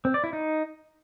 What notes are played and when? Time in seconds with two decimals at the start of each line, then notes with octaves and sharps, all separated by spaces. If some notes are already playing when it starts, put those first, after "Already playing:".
0.05 C4
0.14 D5
0.24 E4
0.33 D#4